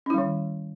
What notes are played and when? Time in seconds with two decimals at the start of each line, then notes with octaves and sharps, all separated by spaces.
0.06 C#4
0.10 E4
0.14 G3
0.18 D#3